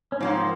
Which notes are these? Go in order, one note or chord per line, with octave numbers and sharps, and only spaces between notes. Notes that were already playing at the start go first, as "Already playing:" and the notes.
C#4
G#2 F3 A#3 C4